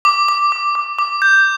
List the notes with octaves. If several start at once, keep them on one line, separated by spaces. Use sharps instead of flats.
D6
D6
D6
D6
D6
G6